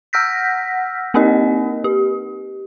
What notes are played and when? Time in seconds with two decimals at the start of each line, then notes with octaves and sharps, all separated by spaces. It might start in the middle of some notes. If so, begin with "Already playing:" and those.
0.13 F#5 E6 F6 G6 A#6 B6
1.14 A#3 C4 D#4 G4 A#4 D#5
1.84 G4